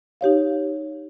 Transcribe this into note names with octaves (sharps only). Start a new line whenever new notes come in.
D#4 G4 C#5 F5